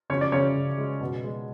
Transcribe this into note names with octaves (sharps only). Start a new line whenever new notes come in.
C#3 C#4 C#5
D5
C#3 C#4 C#5
C#3
G#3
B2
G#3